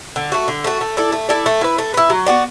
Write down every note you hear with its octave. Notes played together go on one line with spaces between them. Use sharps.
D3
A3 F#4
D3
A3 F#4
A3
E4 A4 D5
A3
E4 A4 D5
A3
E4 B4
A3
E4 B4
F#3
B3 F#4 D5